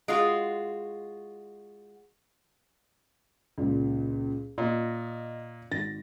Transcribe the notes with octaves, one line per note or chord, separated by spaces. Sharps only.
G#3 F4 F#4
C#2 A#2
A#2 D#5
G#1 A6 A#6